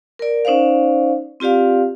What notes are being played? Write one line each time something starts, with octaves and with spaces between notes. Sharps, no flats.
A#4 D5
C#4 D#4 C5 D5 F5
C4 F4 G4 D5 F5